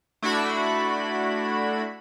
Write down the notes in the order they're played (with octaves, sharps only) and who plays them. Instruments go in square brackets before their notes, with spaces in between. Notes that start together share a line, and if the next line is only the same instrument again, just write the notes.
[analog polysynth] A3 D4 E4 F#4 B5